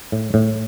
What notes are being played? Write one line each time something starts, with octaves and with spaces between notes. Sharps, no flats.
A2
A2